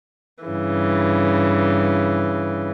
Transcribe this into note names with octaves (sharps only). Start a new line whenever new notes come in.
G2 C#3 E3